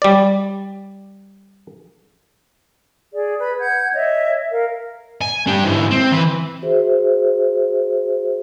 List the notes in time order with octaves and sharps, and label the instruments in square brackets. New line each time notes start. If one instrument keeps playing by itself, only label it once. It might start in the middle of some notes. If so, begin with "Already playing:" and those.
[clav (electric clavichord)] G3 D5
[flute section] G#4 D5
B4 B5
F#5 G6 G#6
C#5 D#5 E5
A#4 F5
[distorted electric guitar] G#5
D4 G4
G#2 E3
C4
E3 B4
[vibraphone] F#4 G#4 C5 E5